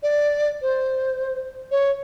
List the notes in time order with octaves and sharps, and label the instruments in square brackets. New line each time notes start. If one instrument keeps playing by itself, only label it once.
[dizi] D5
C5
C#5